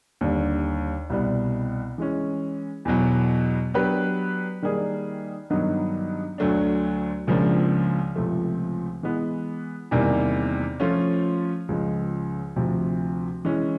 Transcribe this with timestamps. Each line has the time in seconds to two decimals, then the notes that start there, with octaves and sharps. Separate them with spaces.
0.21 D#2 D3 G3
1.10 C2 B2 G3 B3
1.98 E3 G#3 C#4
2.85 E2 B2 F#3
3.74 F#3 B3 D4 G4 B4
4.62 D#3 G3 A#3 D#4 G#4
5.50 G2 D#3 F#3 B3 D#4
6.38 D2 D3 F#3 A3 D4
7.27 C#2 C#3 F3 A#3 D4
8.15 C#2 C3 F3 A3
9.03 E3 G#3 B3
9.91 E2 C3 D#3 G3 A#3
10.80 F3 A3 C#4 F4
11.69 C#2 C#3 F3 G#3
12.56 D2 C3 F3
13.45 E3 G#3 C#4